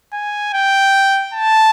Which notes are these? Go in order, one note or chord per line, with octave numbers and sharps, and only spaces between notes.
G#5
G5
A5